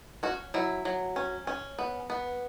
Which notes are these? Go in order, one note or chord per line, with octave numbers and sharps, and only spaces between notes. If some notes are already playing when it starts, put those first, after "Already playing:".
C#4 F#4
F#3 E4
F#3
C#4
C#4
B3
B3